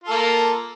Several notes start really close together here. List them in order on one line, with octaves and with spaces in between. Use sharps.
F4 A4 A#3